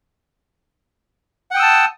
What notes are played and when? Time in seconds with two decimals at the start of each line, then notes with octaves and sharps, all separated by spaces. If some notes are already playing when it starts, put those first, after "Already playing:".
1.51 F#5
1.54 G5
1.57 D#6
1.60 E6
1.62 A5